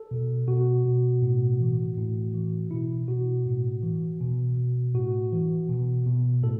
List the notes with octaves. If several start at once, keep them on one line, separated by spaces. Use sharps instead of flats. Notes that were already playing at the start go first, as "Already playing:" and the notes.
Already playing: A4
B2
B2 F#4
B2
A2
E3
A2
E3
B2 E4
B2 F#4
A2
E3
B2
B2
A2 F#4
E3
B2
B2
A2 A4